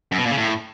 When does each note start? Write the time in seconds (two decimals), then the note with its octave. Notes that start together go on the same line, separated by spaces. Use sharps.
0.12 F#2
0.18 B2
0.25 A#2
0.31 C#3
0.37 A2